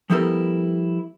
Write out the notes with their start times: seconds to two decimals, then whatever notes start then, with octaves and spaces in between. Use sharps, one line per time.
0.10 F3 G3 B3 E4 A4 A#4